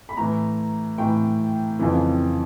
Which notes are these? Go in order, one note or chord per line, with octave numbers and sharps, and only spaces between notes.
B5
A2 E3 A#5
A2 E3 G5
F2 C#3 E3